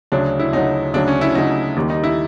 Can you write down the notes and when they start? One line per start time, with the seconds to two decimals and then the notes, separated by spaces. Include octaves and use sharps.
0.12 D2 C#3 F#3 D4
0.39 E4
0.52 D2 C#3 F#3 D#4
0.93 D2 C#3 F#3 D4
1.08 C#4
1.21 E4
1.35 D2 C#3 F#3 D#4
1.76 D#2 D#3 G3
1.90 D#4
2.04 E4